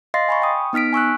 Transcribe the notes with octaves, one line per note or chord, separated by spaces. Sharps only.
D#5 F5 C6 A6 A#6 C7
G#5 B5 C#6
G5 D#6
B3 D#4 F6 B6 D7
G#5 C#6 E6 F#6